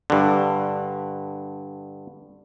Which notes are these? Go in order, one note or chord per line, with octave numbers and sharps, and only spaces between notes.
G2 D3